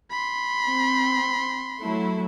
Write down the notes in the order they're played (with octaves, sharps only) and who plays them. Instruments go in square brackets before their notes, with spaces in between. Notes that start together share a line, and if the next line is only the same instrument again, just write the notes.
[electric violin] B5 C6
[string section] C4
F#3 A3 E4